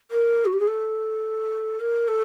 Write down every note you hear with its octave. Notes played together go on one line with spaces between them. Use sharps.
A#4
F#4
G4
G#4
A4
A#4
A4